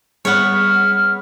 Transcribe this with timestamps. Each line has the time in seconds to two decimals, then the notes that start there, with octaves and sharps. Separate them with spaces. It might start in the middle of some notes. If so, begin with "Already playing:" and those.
0.25 G3 B3 G#4 C#5 F6 B6